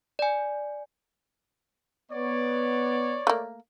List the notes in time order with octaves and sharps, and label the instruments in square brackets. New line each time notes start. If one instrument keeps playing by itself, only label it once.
[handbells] D5 G#5
[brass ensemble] B3 [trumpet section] C#5 D5
[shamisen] A3 A#3